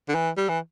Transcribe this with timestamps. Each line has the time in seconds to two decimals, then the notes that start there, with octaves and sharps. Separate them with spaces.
0.09 D3
0.15 E3
0.37 G3
0.49 E3